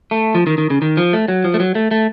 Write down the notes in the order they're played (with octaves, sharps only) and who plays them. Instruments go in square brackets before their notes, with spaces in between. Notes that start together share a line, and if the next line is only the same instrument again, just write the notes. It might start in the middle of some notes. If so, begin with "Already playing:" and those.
[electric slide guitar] A3
F3
D#3
D#3
C#3
D#3
F3
A3
F#3
F3
A3
F#3
A3
A3